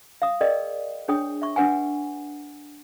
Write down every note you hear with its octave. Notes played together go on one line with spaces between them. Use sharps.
F5 D#6
G#4 A#4 B4 D5 D#5 G5
D4 G#4 C#5 G5 D#6
E5 C#6
D4 B4 F#5 G#5